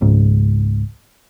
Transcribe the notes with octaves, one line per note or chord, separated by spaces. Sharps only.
G#1 C#2 G#2